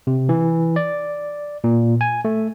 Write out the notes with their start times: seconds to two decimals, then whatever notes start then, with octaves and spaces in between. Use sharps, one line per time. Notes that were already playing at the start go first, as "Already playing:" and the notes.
0.07 C3
0.29 E3
0.76 D5
1.64 A#2
2.01 G#5
2.25 A3